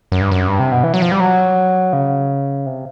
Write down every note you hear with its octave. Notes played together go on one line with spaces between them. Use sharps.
F#2
G2
F#2
G2
C3
B2
E3
F#3
F3
G3
F#3
C#3
C3